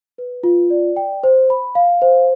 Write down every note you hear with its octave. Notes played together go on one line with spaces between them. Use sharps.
B4
F4
D5
G5
C5
B5
F5
C5